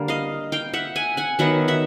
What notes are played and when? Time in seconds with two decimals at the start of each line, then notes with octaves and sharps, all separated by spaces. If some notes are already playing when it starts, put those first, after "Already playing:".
Already playing: D3 G3 A#3
0.08 D#5 F5
0.52 F5 G5
0.74 E5 F#5
0.96 F#5 G#5
1.17 F#5 G#5
1.39 D#3 F#3 B3 E5 F#5
1.68 E5 F#5